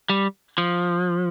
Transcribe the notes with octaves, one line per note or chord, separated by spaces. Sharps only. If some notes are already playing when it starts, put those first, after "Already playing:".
G3
F3